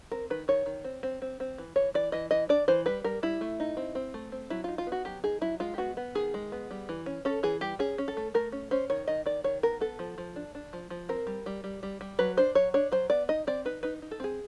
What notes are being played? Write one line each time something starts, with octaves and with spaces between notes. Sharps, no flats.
C4 A#4
D#3 B4
D#3 C#5
D#3
C4
C4
C4
C4
E3
E3 C#5
E3 D5
E3 D#5
E3 D#5
D4 D5
E3 C5
G3 B4
G3 A#4
G3 E4
A3
D#4
C4
C4
A3
C4
F#3 E4
D#4 F4
F4
B3
F#4
F#3 G4
D#4 G#4
F#3 E4
G#3 F4
G4
B3 F#4
B3
D#3 G#4
G#3
B3
G3
E3
C#4
C#4 A4
E3 G#4
G3 G4
C#4 G#4
C#4
A4
A3
A3 A#4
C#4
C#4 C5
D#3 C#5
D#3 D#5
D#3 D5
D#3 C#5
B3 A#4
B3 A4
F3
F3
D4
D4
F3
F3
C4 A#4
G3
G3
G3
G3
G3
F#3 B4
D4 C5
F#3 C#5
D4 C#5
F#3 C5
B3 D5
D#4 D#5
C4 D5
D#4 B4
D#4 B4
D#4
A4
C4 G#4